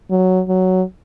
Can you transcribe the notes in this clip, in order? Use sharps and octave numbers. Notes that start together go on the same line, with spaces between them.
F#3
F#3